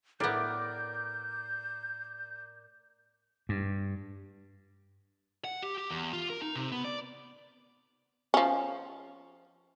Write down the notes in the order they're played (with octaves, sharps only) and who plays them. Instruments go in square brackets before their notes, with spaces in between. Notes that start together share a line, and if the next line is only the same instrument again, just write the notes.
[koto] A2 B3 [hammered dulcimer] A#4 D5 [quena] G6
[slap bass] G2
[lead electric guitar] F#5
G4
G4
E2
F4
A#4
D#4
C3
B3
D5
[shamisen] F3 C#4